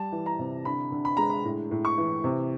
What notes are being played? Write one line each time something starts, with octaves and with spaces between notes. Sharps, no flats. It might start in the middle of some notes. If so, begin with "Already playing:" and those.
Already playing: G3 A5
E3
A#5
C3
D3 B5
D3
B5
G#3 A#5
B5
A2
A2
C#6
E3
C3